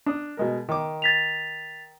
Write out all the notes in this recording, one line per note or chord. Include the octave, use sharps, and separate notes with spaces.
D4 D#6
B2 G#3 A#4
D#3 D6
A6 B6 F7